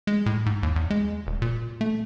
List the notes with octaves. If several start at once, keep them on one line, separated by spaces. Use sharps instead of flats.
G#3
A2
G#2
D#2
E2
G#3
D#1
A#2
A3